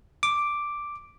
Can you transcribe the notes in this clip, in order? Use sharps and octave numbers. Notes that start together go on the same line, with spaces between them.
D6